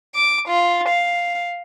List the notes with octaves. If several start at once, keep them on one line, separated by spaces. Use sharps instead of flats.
D6
F4
F5